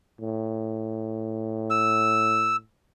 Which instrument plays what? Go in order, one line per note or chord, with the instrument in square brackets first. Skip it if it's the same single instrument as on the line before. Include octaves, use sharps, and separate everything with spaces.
[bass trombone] A2
[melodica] E6